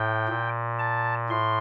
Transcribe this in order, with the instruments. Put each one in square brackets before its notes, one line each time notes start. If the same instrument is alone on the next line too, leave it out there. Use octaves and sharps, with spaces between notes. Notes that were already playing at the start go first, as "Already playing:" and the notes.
Already playing: [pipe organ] A2 G5
A#2
A5
A2 C6